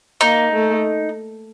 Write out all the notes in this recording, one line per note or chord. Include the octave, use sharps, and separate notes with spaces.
A#3 D#4
A3